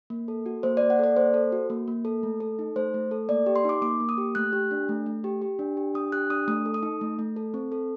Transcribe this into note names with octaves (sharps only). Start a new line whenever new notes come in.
A#3
A4
F#4
A#3 C5
D5
A#3
F#5
A4 D5
A#3 C5
A4
F#4
A#3
A#3
A4
A3
A4
D#4
A3 C5
A3
A4
A#3 D5
G4
C6
D#4 D6
A#3 D6
A#3
D#6
G4
A3 F#6
G4
D4
A3
A3
G4
G4
D4
G4
D4 D#6
G4 F#6
D4 D#6
A3 D#6
A4
D#6
D#4
A3
A3
A4
C4
A4